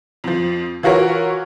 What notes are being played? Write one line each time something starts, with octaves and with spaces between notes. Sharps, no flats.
F2 F3
E3 F4 F#4 A#4 C#5